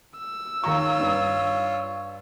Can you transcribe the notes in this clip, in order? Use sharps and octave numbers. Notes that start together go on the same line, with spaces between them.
E6
D#2 F4 C#5 A#5 C#6
G2